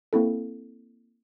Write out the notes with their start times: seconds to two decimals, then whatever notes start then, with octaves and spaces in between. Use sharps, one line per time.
0.13 A#3 C4 E4 A4